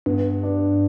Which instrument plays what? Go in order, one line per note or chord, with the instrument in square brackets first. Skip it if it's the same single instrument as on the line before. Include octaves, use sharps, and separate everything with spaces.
[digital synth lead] G2 [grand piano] B3
[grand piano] D4